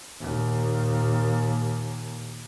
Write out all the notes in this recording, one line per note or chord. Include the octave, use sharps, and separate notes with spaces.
D#2 A#2